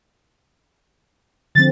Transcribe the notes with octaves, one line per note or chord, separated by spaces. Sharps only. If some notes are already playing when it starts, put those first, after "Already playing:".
D3 F3 C4 A6